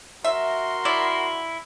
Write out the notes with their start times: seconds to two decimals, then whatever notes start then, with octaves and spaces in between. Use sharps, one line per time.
0.24 F#4 A#4 E5 C6
0.85 E4 D5